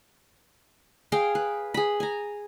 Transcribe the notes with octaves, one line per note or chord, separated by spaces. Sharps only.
G#4 F5 G5
B4
G#4 B5
G#5 A#5